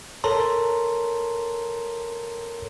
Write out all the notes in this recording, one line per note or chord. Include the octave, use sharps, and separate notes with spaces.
A4 A#4 C#5 A5 A#5 C6